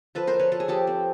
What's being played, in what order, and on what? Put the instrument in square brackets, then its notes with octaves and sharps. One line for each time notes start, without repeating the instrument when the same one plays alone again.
[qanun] F3 A4 B4
A#4 C5
F3
B4 C#5
F3 A4
G#4
F3 G4 A4
C4